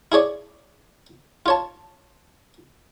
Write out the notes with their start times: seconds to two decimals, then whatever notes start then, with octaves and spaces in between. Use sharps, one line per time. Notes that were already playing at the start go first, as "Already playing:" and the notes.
0.12 E4 G#4 C#5 D5
1.46 F4 C#5 A5